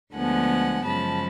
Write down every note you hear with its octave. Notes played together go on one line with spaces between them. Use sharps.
D2 D3 F3 G#3 B3 F#5 G#5
F#2 C#3 F3 G#3 A5 B5